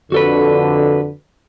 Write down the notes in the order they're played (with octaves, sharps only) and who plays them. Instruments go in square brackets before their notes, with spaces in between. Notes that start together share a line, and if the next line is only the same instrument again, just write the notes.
[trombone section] F2 D3 [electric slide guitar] F#4 A4 B4